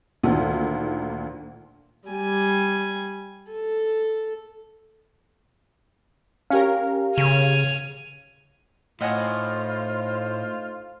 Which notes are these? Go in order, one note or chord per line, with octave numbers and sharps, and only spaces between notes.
D2 A#2 D#3
G3 G#5
A4
C#4 G4 A#4 F5
C#3 G#5 F6
A2 A3 D#4 F4 C5 D#5 F#5 G#5